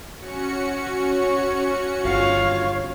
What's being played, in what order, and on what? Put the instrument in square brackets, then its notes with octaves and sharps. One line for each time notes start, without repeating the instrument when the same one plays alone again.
[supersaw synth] C#4 F#4 C#7
[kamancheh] C#5
[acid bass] G1 [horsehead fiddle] F4 F5 [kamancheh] C#5